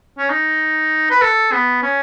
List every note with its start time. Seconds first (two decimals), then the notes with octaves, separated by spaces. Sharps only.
0.18 C#4
0.30 D#4
1.11 B4
1.21 A4
1.52 B3
1.82 C#4